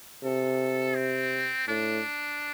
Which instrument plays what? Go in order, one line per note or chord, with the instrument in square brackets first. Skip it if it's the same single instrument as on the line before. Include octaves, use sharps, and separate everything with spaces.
[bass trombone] C3 [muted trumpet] A4
[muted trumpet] C4
[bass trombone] A2 [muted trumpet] D4